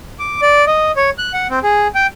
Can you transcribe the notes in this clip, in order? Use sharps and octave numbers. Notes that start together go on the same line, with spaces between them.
D6
D5
D#5
C#5
F#6
F#5
C4
G#4
G5